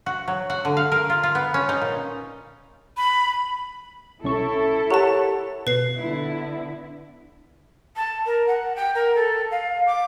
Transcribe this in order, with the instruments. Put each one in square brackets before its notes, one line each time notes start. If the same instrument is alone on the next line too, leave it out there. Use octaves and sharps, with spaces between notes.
[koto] F#4
F#3
F#4
D3
F5
A#4
F4
F4
B3
C#4
D#4
A#2
[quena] B5
[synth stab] C2 C#4 C#6 [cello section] E4 A4
[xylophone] G4 A5 [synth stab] A#4 C#5 F#5
[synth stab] B2 [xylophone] B4 C7
[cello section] D3 B3 E4
[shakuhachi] A5
A#4
F#5
G5
A#4
A4
F5
D6